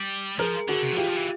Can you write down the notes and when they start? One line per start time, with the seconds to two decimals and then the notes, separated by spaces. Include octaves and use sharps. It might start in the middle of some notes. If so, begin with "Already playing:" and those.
Already playing: G3
0.39 F3 G#4 A#4
0.68 D3 F#4 G#4
0.83 C3
0.92 F3
0.97 E3 F4 G4
1.07 F3
1.16 E3